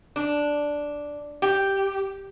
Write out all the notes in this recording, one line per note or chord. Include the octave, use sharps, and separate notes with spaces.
D4
G4